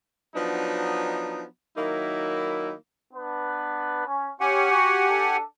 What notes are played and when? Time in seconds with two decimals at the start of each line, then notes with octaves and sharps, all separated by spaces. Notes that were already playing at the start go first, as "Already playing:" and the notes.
0.36 F3 F#3 B3 D4 D#4
1.77 D#3 F#3 A#3 D#4 E4
3.14 B3 D4 B4
4.07 C#4
4.40 C#4 G4 F#5 G#5
4.71 F#4
5.09 D4 A4